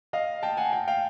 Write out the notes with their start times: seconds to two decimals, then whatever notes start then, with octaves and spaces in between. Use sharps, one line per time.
0.13 D#5 F5
0.43 G5 A5
0.57 F#5 G#5
0.73 G5 A5
0.88 F5 G5